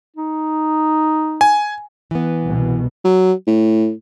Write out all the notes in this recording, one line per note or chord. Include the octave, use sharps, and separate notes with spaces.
D#4
G#5
E3 B3
C2 B2
F#3
A2